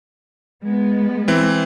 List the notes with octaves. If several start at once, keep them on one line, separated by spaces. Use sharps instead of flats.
G#3 B3
E3 C4